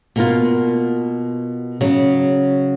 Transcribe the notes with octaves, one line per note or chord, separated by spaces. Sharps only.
B2 A#3 F4
C#3 F#3